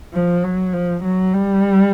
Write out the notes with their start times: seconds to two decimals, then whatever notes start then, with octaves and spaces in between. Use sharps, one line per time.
0.14 F3
0.44 F#3
0.73 F3
1.04 F#3
1.33 G3